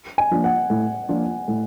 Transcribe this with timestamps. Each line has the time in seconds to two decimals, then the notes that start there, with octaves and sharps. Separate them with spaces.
0.18 G#5
0.31 F3 A#3 D4 F4
0.44 F#5
0.70 A2
1.09 F3 A#3 D4 F4
1.48 A2